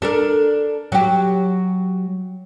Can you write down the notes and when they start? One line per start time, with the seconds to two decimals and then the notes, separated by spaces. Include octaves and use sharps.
0.02 D4 A4 A#4
0.92 F#3 G4